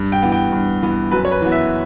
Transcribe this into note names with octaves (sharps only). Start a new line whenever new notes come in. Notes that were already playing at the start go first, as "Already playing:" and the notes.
Already playing: G2
G5
E3 B3
G5
G2
E3 B3
F#2 B4
C#5
B4
E3 B3
E5